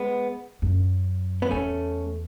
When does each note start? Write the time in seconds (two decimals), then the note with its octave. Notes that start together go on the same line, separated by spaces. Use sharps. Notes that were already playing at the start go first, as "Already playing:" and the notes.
Already playing: G#3 B3
0.62 F#2
1.42 B3
1.51 E2 A3 C#4